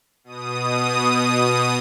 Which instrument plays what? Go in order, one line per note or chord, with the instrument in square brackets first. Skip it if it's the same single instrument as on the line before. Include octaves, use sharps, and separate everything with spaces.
[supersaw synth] B2 D#6